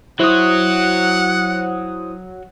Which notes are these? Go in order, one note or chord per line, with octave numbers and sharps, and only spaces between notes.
F#3 E4 F#4 C5 F#5 D#6